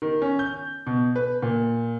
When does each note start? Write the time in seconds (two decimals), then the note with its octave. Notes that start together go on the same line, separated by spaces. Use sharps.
0.02 D#3
0.22 C#4
0.39 G6
0.87 B2
1.16 B4
1.42 A#2